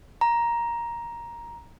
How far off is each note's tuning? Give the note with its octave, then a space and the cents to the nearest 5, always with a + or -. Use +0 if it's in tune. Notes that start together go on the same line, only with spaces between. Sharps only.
A#5 +10